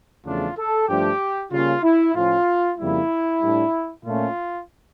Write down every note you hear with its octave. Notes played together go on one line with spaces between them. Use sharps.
E2 C#3 F3 A3 D4 F4
A4
G2 F3 A3 D4 G4
C#3 G3 A#3 C#4 F4
E4
A2 F3 C#4 F4
F2 C#3 G3 A#3 E4
A2 G3 D4
A#2 A3 C#4 F4